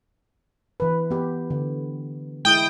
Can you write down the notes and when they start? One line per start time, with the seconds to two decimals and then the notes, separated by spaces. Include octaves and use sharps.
0.80 E3 B4
1.11 B3 G4
1.50 D3
2.45 G#3 E4 G5 D#6